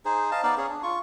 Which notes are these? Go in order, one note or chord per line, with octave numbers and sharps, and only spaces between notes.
D#4 G#4 C5
D#5 F5 A5
B3 D#4 D5 F5
C#4 G#4
D4
F4 C#6